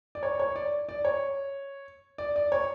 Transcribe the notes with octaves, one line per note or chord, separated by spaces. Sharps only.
D5
C#5
C#5
D5
D5
C#5
D5
D5
C#5